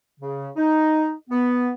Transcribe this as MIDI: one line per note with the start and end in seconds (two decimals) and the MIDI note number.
0.20 0.48 49
0.56 1.13 63
1.30 1.70 59